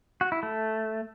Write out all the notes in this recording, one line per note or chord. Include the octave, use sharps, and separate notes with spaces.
F#4
E4
A3